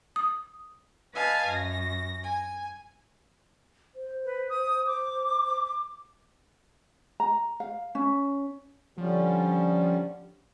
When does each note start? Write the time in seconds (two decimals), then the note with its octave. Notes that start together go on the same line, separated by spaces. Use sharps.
0.16 D#6
1.13 B4 D#5 F5 G#5 A5
1.49 F#2 A#6
2.24 G#5
3.96 C5
4.25 B4
4.50 D#6
4.87 D6
7.20 A#5
7.60 F5
7.95 C#4
8.98 D3 F3 G3 C#4